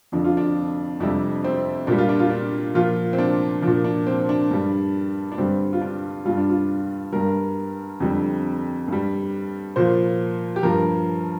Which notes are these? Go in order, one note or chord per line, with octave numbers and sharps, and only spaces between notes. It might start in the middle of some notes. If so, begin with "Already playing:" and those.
F2 D3 F3 D4
F4
D4
F2 C3 G3 D4
C4
A#2 G3 D4
F4
D4
F4
D4
A#2 F3 F4
C4
D4
A#2 F3 D4
D4
C4
D4
G2 G3
D4
G2 D3 G3 C4
F4
D4
G2 G3 F4
D4
F4
G2 G3 A#4
F2 D3 G3
G2 G3
A#2 F3 C5
G4
G2 F3 A#4